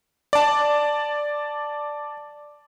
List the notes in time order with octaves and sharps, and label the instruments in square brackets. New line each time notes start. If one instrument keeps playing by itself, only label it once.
[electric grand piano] D5 A5